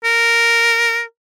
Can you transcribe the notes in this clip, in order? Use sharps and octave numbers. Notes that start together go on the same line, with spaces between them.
A#4